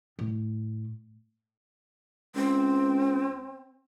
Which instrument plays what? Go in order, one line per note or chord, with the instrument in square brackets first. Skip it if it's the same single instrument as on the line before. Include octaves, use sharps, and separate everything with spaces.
[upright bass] A2
[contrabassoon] C#2 [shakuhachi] C4